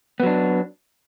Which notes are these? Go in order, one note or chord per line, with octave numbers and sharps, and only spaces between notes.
F#3 B3 D4